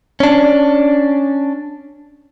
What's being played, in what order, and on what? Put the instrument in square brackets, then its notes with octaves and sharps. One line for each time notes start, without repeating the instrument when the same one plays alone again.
[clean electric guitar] C#4 D4